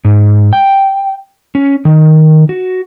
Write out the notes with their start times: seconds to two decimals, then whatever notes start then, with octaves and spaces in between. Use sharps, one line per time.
0.05 G#2
0.53 G5
1.55 C#4
1.85 D#3
2.49 F#4